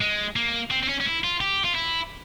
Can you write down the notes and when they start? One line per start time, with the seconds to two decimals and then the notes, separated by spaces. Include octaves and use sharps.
0.01 G#3
0.36 A#3
0.71 C4
0.83 C4
0.89 C#4
1.00 C#4
1.06 E4
1.24 F4
1.41 G4
1.65 F4
1.75 E4